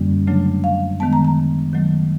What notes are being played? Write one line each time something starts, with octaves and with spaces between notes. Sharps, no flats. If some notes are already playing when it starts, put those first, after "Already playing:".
Already playing: F#2 D3 G3 A#3 C#4
C#3 F#3 A3 D4
F5
D#3 G#3 B3 A5
A#5
A#5
D#3 F#3 A3